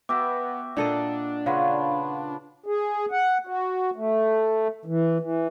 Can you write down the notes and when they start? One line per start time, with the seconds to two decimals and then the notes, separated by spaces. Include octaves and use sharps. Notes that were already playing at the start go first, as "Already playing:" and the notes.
0.09 B3 F#4 E5 G5 D6
0.77 A#2 D4 A4 D#5
1.46 C#3 F4 B4 C#5 F5 F#5
2.66 G#4
3.11 F#5
3.47 F#4
3.96 A3
4.85 E3
5.20 E3